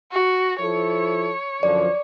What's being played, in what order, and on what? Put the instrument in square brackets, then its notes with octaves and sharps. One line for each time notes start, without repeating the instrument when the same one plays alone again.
[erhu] F#4
[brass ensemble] F3 E4 A4 [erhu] C#5
[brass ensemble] F#2 D3 F3 [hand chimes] D5